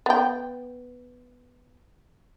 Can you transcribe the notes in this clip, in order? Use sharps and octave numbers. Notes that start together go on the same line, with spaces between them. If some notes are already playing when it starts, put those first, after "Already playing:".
B3 G5